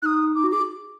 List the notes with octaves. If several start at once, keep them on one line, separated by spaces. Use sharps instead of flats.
D#4 D#6 F#6
D#4 D6
F#4
G#4 D6